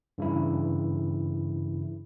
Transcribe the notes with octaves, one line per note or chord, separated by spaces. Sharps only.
G2 C#3 E3 E4